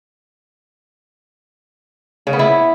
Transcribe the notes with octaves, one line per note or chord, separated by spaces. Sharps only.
C#3
B3
E4